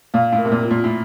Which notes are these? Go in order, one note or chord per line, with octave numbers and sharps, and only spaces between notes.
A#2 F5
A2
A#4
C3
A#2
F4
A#2
A2